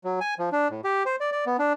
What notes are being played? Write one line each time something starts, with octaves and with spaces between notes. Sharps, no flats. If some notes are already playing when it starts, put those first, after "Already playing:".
F#3
G#5
F3
D4
A2
G4
C5
D5
D5
B3
D4